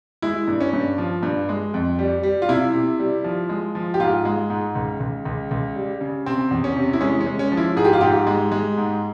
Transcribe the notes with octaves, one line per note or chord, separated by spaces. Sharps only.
G#3 E4
G2
C#4
G2
F3
G2
G#3
F2
G3
G3
F4
C3 E4
C3
G3
F3
G#3
F3
G4
G#2 F4
G#3
G#2
C#2
C#2
C#2
C#2
G3
C#3
C3 C4
E2
C#4
C3
E4
G#3 C#4
C#4
G#3
C#4
F3
E4
G#2 G#4
G4
F4
G#2 G4
G#3
G#3
G#2